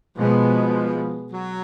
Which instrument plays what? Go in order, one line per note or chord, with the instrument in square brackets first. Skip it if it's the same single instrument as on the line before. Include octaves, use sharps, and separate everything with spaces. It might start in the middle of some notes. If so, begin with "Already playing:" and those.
[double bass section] B2 G#3 B3 [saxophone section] F3
[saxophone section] F#3